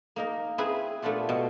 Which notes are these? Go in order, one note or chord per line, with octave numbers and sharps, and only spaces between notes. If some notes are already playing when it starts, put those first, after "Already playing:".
A#3 D#4 A#4
C4 E4 G#4 B4 E5
A#2 A3 B3 D4 F4 G4
B2